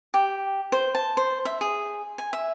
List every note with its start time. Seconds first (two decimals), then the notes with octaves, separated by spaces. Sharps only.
0.14 G4
0.72 C5
0.95 A5
1.17 C5
1.45 E5
1.61 G#4
2.18 G#5
2.33 E5